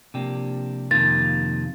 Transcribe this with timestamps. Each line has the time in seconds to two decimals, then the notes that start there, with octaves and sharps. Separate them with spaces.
0.14 C3 F3 A#3 D4 G4
0.91 F2 C3 D#3 A#3 F4 A6